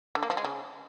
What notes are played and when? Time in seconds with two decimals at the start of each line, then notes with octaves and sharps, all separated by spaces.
0.15 D3
0.23 A#3
0.30 F3
0.37 G#3
0.44 C#3